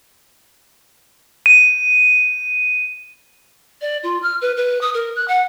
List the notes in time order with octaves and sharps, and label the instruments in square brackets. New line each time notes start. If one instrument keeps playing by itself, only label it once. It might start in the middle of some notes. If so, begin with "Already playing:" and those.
[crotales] D#7
[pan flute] D5
F4
F6
B4
B4
D#6
A#4
F#6
F#5